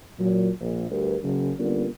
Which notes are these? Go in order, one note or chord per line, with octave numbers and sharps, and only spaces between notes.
A#2 F#3
A#1
D2 G3 G4 A#4 B4
F#1 F#2 C#3
D3 G3 A#3 B3 C#4 F4